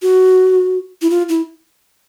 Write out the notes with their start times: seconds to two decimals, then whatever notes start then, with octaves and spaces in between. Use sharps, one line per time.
0.02 F#4
1.02 E4
1.10 F4
1.29 E4